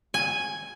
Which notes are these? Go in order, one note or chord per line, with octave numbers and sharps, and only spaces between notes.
G#5